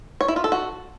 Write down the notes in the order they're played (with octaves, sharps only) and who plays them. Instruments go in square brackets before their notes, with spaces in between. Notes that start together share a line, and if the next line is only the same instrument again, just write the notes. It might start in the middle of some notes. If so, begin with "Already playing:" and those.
[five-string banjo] C#5
E4
F4
A4
F#4